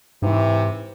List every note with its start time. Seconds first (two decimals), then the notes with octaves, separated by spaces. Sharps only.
0.22 G#2 C3 E3